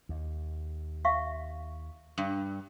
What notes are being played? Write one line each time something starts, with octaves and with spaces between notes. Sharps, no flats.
D#2
E5 F5 C#6
G2